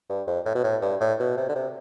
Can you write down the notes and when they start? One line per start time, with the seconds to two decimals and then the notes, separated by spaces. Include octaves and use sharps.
0.09 G2
0.27 F2
0.46 A2
0.55 B2
0.64 A2
0.82 G2
1.00 A2
1.20 B2
1.37 C3
1.49 D3
1.55 C3